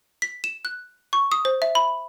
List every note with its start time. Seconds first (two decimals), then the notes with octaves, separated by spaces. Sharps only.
0.22 B6
0.44 E7
0.65 F#6
1.13 C#6
1.32 D#6
1.45 C5
1.62 E5
1.75 B5